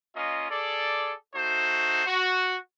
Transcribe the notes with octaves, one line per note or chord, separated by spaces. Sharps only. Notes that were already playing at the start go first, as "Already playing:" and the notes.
A#3 C#4 F4 D#5
G#4 A4 D5
A3 D#4 F#4 C5
F#4